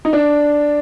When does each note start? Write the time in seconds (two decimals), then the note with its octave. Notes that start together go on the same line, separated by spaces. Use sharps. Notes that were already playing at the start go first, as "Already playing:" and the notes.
0.05 D#4
0.13 D4